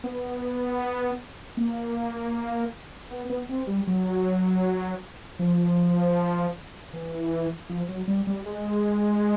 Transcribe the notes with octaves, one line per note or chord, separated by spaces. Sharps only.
B3
A#3
B3
B3
C4
G3
F#3
F3
E3
F3
F#3
G3
G3
G#3